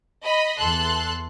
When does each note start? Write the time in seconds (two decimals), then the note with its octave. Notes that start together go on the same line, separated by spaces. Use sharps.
0.23 D#5 B5
0.58 E2 A4 C6 F#6